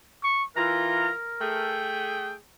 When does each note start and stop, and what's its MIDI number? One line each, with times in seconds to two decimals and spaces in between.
0.24 0.44 85
0.57 1.09 52
0.57 1.09 65
0.57 1.79 70
0.57 1.13 82
1.41 2.35 57
1.41 2.35 68
1.41 2.32 79